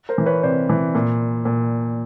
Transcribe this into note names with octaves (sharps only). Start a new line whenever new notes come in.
A#4 C5
E3
B4 C#5
C3 C5 D5
E3
A#2
A#2